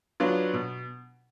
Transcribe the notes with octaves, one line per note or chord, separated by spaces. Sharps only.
F#3 B3 D4 F4
B2